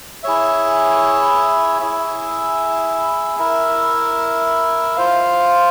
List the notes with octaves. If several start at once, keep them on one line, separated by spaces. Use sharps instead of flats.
E4 G#4 C#5 E5
E4 G#4 E5
E4 A#4 E5
F4 C5 F5